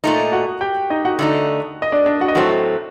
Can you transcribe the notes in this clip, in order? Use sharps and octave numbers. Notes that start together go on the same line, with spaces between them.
A#2 A3 D#4
F#4 F#5
G4 G5
D#4 D#5
F#4 F#5
D3 A3 D#4
D#5
D4 D5
D4 D5
F#4 F#5
D#5
A2 F#3 A3 C4 F#4 F#5